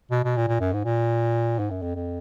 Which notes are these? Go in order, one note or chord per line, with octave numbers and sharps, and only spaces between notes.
B2
B2
A#2
A#2
F#2
G#2
A#2
G#2
F#2
F2
F2